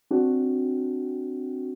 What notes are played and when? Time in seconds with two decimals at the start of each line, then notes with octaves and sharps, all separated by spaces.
0.11 C4 D4 F#4